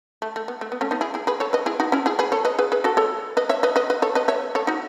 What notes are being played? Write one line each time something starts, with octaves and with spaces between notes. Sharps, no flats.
A3
A3
B3
A3
B3
A3 C#4
B3 D#4
E4 G#4
E4 G#4
G#4 B4
A4 C#5
B4 D#5
E4 G#4
D#4 F#4
C#4 E4
E4 G#4
G#4 B4
A4 C#5
B4 D#5
G#4 B4
G#4 B4
F#4 A4
A4 C#5
B4 D#5
C#5 E5
B4 D#5
B4 D#5
B4 D#5
A4 C#5
B4 D#5
C#5 E5
A4 C#5
D#4 F#4